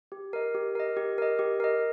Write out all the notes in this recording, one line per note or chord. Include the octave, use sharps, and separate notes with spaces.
G4
A#4 D#5
G4
A#4 D#5
G4
A#4 D#5
G4
A#4 D#5